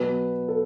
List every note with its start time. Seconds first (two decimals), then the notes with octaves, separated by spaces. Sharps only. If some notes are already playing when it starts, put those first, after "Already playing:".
Already playing: B2 F#3 B4
0.48 A4